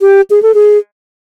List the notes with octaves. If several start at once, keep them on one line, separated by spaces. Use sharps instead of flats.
G4
G#4
A4
G#4